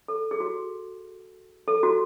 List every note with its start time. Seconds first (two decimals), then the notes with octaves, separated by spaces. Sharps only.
0.08 A4
0.31 G#4
0.40 F#4
1.68 A4
1.83 F#4